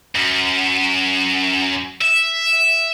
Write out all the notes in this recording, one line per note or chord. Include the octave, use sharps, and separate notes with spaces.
F#2
E5